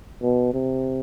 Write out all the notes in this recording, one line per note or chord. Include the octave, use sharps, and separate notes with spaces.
B2
C3